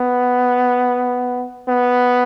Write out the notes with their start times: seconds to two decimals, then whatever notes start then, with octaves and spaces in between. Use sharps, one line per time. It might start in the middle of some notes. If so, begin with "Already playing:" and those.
Already playing: B3
1.68 B3